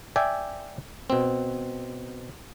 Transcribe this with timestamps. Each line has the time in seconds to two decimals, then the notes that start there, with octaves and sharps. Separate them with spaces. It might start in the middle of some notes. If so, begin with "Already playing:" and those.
0.16 D5 E5 G5 G#5
1.10 B2 C4